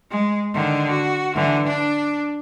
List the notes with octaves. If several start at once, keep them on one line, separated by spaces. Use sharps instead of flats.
G#3
D3 D#3
F#4
D3 E3
D4